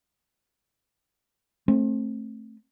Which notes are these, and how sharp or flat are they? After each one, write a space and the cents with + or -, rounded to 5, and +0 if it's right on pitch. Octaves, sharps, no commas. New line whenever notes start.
A3 +0 C4 +30